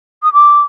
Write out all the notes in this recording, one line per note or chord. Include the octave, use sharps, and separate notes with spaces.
D#6
D6